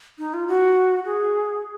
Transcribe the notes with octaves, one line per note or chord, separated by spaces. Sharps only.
D#4
F4
F#4
G#4